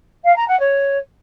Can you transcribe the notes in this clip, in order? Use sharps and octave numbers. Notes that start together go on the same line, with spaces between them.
F5
A#5
F#5
C#5